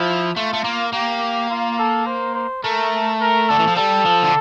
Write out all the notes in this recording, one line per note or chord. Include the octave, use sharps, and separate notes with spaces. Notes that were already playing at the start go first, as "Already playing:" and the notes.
Already playing: F3 E4
A3 F4
A3
A#3
A#3 G4
F4
A4
C5
C5
A3 A#4
A#4
D3 A4
E3
F3
G3 A4
F3
D3